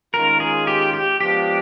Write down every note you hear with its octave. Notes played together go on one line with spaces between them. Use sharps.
D#3 G#3 C#4 F4 A#4
G#4
G4
G4
F3 G#3 B3 D4 F4 G4